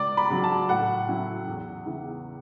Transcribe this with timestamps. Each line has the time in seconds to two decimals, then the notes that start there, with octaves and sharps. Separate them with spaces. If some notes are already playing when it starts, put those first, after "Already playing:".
Already playing: C#2 D5
0.17 B5
0.30 C#3 F#3
0.44 A5
0.69 A2 F#5
1.08 F#3 C#4 E4
1.47 E2
1.86 C#3 E3 B3 E4